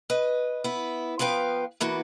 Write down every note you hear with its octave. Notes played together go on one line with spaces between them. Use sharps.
B4 D#5
B3 E4
F3 B3 B4 F5 G5
E3 A#3 B3 F#4